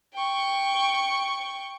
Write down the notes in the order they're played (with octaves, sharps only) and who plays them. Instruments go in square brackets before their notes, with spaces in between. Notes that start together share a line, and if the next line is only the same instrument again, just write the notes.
[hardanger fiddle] G5 C#6